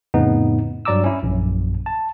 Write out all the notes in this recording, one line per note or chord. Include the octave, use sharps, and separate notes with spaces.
F2 A2 C#3 B3 D#4
G2 F#3 D5 A#5 D6 E6
C#4 E4
A#1 F#2
A5